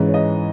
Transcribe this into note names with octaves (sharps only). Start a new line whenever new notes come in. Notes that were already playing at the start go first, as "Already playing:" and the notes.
Already playing: G#2 E3 G#3 C#4
C#5
D#5